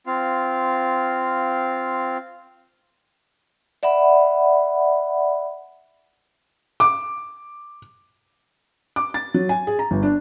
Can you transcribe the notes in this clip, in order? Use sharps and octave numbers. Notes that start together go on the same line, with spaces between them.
C4 F4 F5
D5 E5 F#5 B5
D6
D6
A6
F#3
G#5
G#4
A#5
G1
D4